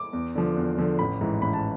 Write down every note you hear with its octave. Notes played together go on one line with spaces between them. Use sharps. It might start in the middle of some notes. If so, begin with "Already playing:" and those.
Already playing: D6
E2
D3 F3
E2
D3 F3
A1 B5
G#2 E3
A1 B5
A5